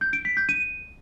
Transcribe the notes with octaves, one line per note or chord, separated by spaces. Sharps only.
G6
D7
B6
G6
D#7